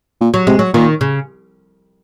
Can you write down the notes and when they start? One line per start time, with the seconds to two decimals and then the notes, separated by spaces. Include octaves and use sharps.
0.21 A#2
0.34 F#3
0.47 C3 G#3
0.59 F#3
0.74 A#2 D#3
1.01 C#3